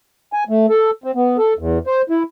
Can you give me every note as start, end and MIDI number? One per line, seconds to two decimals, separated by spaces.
0.33 0.44 80
0.49 0.66 57
0.69 0.91 69
1.04 1.11 60
1.15 1.37 59
1.38 1.53 69
1.59 1.79 40
1.87 2.02 72
2.10 2.23 64